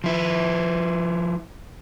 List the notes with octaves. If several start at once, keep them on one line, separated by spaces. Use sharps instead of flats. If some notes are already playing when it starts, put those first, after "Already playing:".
F3 E4